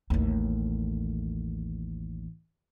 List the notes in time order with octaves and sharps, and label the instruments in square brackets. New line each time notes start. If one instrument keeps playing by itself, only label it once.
[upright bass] A1 D#2